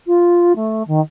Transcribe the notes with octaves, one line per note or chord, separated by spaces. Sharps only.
F4
A3
D#3